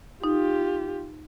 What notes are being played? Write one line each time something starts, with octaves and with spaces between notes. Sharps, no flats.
D#4 F4 G4